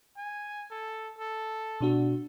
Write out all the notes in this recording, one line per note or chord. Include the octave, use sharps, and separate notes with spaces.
G#5
A4
A4
B2 D4 F#4